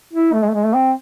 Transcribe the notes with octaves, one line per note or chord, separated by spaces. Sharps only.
E4
A3
G#3
A3
G#3
A3
C4